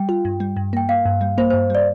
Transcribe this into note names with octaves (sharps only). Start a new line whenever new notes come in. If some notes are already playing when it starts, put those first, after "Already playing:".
Already playing: G3 G5
F4
G2
G3
G2
A#3 G5
A#3 F5
G2
G3
A#3 C5
C5
G2
G3 D5